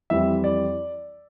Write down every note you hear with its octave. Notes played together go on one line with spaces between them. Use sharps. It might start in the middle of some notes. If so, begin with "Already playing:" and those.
F2 E3 G3 E5
D5